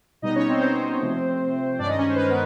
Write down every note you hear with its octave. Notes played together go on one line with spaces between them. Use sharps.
B2 G3 B3 D#4 D#5
C#4 C#5
C4 C5
C4 C5
C3 F3 A3
G2 D#3 G#3 C#4 D4 D5
D#4 D#5
C#4 C#5
C5
B4
A#4
B3 B4